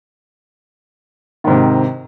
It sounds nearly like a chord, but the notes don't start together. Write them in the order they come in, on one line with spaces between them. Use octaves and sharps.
D#3 G#2 C3